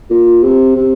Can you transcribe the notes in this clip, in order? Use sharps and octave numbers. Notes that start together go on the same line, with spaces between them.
A#2
C3
C3